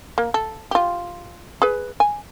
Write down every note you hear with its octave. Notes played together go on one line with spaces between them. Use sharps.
A#3
A4
F4 G4
G#4 B4
G#5